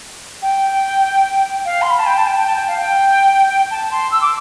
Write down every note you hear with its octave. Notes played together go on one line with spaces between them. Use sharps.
G5
F5
C6
B5
A5
G5
A5
G5
G5
A5
G5
F5
G5
A5
C6
E6
D6